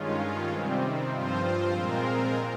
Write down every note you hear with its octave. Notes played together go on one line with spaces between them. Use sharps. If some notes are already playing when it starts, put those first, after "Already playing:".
Already playing: G2 D#3 G#3 C#4 F4
C3 D#3 G3 C4
G2 F3 C4 F4 C5
A#2 G#3 C4 F4 A#4